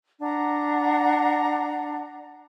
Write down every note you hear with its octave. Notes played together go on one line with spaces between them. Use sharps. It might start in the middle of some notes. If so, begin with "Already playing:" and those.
D4 F#5 A#5